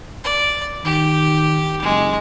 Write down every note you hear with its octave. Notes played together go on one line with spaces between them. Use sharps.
D5
D#3 G4
F#1 G#3